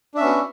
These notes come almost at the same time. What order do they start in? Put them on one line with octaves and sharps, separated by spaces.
D4 E5 C#4 B3 F#4